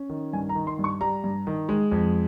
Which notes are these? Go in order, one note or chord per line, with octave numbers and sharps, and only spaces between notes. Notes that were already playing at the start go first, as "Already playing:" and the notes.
Already playing: C#4
D#3
G2 G#5
A#5
D#3
C6
G2
C#6
G3 A#5
G2
D#3
G#3
F2